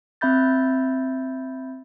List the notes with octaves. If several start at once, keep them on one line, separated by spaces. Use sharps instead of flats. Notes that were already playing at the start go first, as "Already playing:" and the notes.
C4 E5 B5 G6 A6